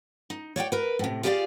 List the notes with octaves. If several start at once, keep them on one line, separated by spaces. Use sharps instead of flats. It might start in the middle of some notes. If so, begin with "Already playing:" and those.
D#4
C#5 D5 F5 G5
A#4 B4
A2 C3
F4 G4 G#4 A#4 D5 F5